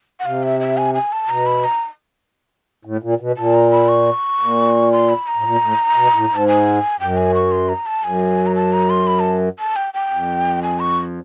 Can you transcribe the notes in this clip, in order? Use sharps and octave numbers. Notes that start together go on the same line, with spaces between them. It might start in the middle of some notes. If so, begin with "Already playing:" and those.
F#5
C3 F5
E5
E5
G#5
G#5
A5
B2 A#5
B5
A#5
A2
A#2
B2
A#2 A5
A#5
B5
C#6
A#2
C6
B5
A#5
A2
A#2
A2
B2
A2
G#2
A5
G#5
F#2 G5
G#5
C#6
C6
A#5
A5
F#2 G#5
A#5
A5
A#5
C6
B5
A5
A5
G5
G5
F2
G#5
C#6